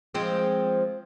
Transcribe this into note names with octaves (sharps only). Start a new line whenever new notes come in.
F3 G#3 C4